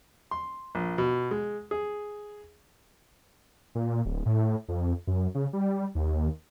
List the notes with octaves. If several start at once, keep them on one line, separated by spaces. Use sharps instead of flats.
C6
A#1
B2
G#3
G#4
A#2
D1
A2
F2
F#2
C#3
G3
D#2